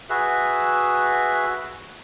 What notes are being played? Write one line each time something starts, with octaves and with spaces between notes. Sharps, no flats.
F#4 G#4 B4 E5